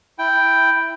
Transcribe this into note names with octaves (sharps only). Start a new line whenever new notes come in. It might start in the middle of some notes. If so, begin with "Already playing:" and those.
E4 G5